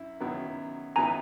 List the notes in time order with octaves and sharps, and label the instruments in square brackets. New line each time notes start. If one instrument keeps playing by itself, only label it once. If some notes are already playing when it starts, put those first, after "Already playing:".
Already playing: [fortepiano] F#2 E4
F#2 D#3 F#3 B3 E4
[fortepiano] F#2 D#3 F#3 B3 E4 [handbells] G#5 A#5